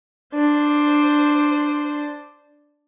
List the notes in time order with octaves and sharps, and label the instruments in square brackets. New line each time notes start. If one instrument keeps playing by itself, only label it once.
[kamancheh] D4 C5